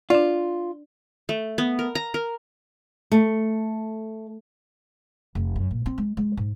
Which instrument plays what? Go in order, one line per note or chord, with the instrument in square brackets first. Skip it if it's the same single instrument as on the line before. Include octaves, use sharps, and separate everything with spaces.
[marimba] D4 D5 [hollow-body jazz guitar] F4
[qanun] A3
B3
A#4
A#5
A#4
[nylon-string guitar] A3
[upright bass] F1
F#2
A#2
C4
G#3
G#3
G#2